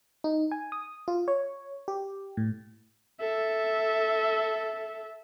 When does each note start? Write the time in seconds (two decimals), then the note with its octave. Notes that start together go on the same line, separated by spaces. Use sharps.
0.24 D#4
0.51 G#5
0.72 D#6
1.08 F4
1.28 C#5
1.88 G4
2.37 A2
3.20 A4 E5